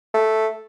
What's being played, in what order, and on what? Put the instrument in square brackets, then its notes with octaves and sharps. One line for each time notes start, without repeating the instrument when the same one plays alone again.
[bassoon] A3